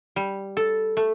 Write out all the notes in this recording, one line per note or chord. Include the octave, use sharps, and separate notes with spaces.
G3
A4
A3